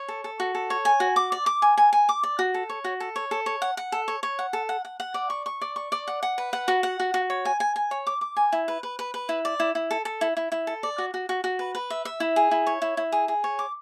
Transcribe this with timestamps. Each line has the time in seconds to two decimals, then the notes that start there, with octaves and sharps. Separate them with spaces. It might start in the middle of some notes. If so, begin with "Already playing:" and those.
Already playing: C#5
0.08 A4
0.24 A4
0.40 F#4
0.55 A4
0.70 C#5
0.85 G#5
1.00 F#4
1.16 D6
1.32 D5
1.46 D6
1.62 G#5
1.77 G#5
1.93 G#5
2.09 D6
2.23 D5
2.39 F#4
2.54 A4
2.69 C#5
2.84 F#4
3.00 A4
3.16 C#5
3.31 A4
3.46 C#5
3.62 F#5
3.77 F#5
3.92 A4
4.08 C#5
4.23 C#5
4.39 F#5
4.53 A4
4.69 F#5
4.85 F#5
5.00 F#5
5.14 D5
5.30 C#6
5.46 C#6
5.61 D5
5.76 C#6
5.92 D5
6.08 F#5
6.23 F#5
6.38 B4
6.53 F#5
6.68 F#4
6.83 F#5
7.00 F#4
7.14 F#4
7.30 C#5
7.45 G#5
7.60 G#5
7.76 G#5
7.91 C#5
8.07 D6
8.21 D6
8.37 G#5
8.52 E4
8.68 B4
8.83 B4
8.99 B4
9.14 B4
9.29 E4
9.45 D5
9.60 E4
9.75 E4
9.91 A4
10.05 A4
10.21 E4
10.37 E4
10.52 E4
10.67 A4
10.83 D5
10.98 F#4
11.14 F#4
11.29 F#4
11.44 F#4
11.59 B4
11.75 B4
11.90 E5
12.05 E5
12.20 E4
12.36 G#4
12.51 E4
12.67 C#5
12.82 E4
12.97 E4
13.12 G#4
13.28 G#4
13.44 C#5
13.59 D6